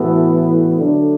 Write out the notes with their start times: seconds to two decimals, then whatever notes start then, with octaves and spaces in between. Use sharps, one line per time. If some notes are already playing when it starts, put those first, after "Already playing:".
Already playing: A2 E3 B3 F#4 A4
0.79 D3 F#3 A3 D4